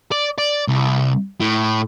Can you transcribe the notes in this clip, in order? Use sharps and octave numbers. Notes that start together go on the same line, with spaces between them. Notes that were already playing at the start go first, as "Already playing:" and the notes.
D5
D5
C2
A2